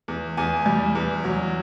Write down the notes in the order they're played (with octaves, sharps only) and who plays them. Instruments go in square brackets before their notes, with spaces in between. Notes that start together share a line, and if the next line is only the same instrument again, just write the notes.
[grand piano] E2
E2 G#5
G3
E2
F#3